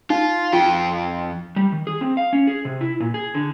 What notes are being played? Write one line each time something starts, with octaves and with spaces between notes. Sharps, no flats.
D#4 F4
F2 F4 G5
G3
D#3
G#4
C4
F5
C#4
G#4
C3
E4
A#2
G#4
D3